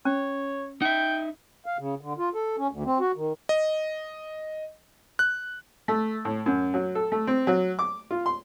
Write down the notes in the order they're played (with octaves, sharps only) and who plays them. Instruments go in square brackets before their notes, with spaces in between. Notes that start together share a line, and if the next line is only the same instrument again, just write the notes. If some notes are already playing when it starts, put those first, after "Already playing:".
[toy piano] C#4 [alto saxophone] C#5
[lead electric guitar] D#4 E5 [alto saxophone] G5
[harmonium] F5
C#3
D3
F4
A4
C#4
D2
C4
F#4
D#3
[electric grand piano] D#5
F#6
[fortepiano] A3
A2
F#2
F#3
A4
A3
C4
F#3
D6
F4
C6